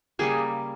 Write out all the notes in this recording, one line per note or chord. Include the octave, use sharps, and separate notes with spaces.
C#3 G3 A#3 G#4